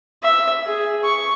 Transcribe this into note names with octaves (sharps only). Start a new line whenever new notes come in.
E5
G#4
C#6